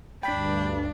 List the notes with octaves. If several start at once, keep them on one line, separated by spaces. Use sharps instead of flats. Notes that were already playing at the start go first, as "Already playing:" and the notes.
D2 G2 D4 G5 B5 B6